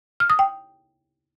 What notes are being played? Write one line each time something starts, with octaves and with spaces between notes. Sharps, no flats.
F6
D#6
G5